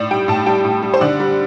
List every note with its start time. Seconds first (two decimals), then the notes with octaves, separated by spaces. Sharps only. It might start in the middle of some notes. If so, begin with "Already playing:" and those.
Already playing: A2 D5
0.11 G3 G5
0.28 A2 A5
0.46 G3 G5
0.65 A2
0.83 G3
0.94 C5
1.01 D3 D5
1.20 G3